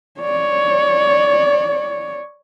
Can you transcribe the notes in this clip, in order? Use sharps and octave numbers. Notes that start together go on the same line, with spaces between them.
C#5 D5